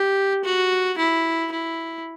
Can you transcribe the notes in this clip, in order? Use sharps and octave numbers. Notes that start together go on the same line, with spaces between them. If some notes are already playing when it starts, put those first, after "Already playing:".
Already playing: G4
F#4
E4
E4